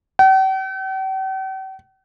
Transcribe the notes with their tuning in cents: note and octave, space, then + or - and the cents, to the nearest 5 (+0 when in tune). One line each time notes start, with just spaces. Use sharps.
G5 -45